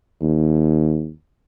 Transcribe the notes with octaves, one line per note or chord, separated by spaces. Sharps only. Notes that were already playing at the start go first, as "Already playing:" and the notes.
D#2